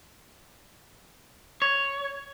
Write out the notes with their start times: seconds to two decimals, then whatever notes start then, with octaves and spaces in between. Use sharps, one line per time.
1.62 C#5